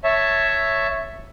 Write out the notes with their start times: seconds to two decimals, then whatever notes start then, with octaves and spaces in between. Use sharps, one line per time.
0.04 C#5 E5 A5